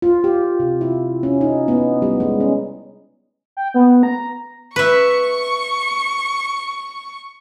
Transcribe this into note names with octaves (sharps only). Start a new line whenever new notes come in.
F4
G4
C3
E4
C#4
D#4
B3
G3
G#3
C#4
G5
B3
A#5
B4 E5 C#6